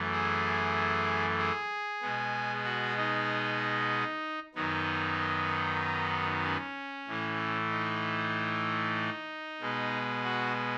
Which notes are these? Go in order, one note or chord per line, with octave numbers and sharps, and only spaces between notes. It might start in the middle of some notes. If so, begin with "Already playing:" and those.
Already playing: F#2 E3 A3
G#4
G#4
B2 G#3 B3
F#4
D#4
F#2 D#3 F#3 B3 D#4
C#4
A2 E3 A3
D#4
B2 G#3 B3
F#4